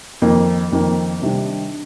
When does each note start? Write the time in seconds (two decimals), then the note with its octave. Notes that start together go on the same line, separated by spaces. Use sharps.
0.22 F2 D#3 A#3
0.72 F2 D#3 A#3
1.22 C3 D#3 G3 D4